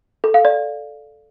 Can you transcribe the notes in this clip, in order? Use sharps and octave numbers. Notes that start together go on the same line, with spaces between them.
A4
F5
D5